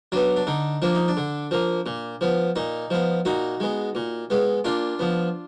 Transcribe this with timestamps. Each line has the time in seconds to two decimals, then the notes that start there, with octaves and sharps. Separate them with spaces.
0.12 F#3 B3 D4
0.36 D4
0.47 D3 D#4
0.82 F3 A#3 D4
0.95 D#4
1.08 D4
1.17 D3
1.51 F3 A#3
1.86 A#2
2.21 F3 B3
2.56 A#2 D#4
2.90 F3 B3
3.25 A#2 D#4 F#4
3.60 G#3 B3
3.95 A#2
4.30 G#3 B3
4.64 A#2 D4 F4
4.99 F3 B3